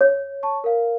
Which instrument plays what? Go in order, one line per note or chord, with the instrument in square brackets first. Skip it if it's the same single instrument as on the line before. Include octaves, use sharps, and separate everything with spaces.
[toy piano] C#5
[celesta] A5 C#6
A#4 F5